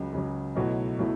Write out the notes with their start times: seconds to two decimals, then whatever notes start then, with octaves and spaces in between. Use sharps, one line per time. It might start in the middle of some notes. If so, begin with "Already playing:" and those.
Already playing: C#2 C#3 F#3
0.13 C#2 C#3 F#3
0.56 B1 B2 F#3 A3 E4
0.99 B2 F#3 A3 E4